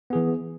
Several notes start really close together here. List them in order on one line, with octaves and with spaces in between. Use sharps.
B3 G#4 E3